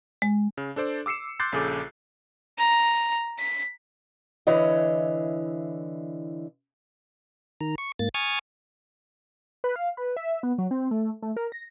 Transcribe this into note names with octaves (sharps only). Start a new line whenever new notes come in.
G#3
C#3
D4 A4 C5 D5
D6 E6 C7 C#7 E7
C6 D6 F#6 G6 A6 C7
A#1 C#3 G#4 A4 D6
A#5
B6
D3 E3 E4 C#5 D#5
D#3 A#5
C#6
G#2 A#3 A6
G#5 C#6 D#6 F6 G#6 A6
B4
F5
B4
E5
B3
F#3
C4
A3
A3
A#4
A#6